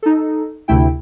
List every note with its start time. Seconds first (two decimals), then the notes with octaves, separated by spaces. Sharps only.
0.03 D#4 A4
0.68 D2 C3 A3 E4 G5